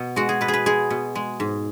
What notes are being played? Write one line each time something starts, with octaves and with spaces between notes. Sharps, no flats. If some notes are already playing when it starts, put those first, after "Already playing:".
Already playing: B2
G#3 F#4
G#4
B2 B4
G#4
B4
G#3 G#4
B2
G#3
G#2